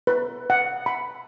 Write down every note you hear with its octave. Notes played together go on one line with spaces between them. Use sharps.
B4
F#5
B5